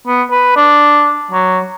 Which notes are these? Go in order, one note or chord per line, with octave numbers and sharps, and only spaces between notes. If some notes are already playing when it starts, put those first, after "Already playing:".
B3
B4
D4
F#3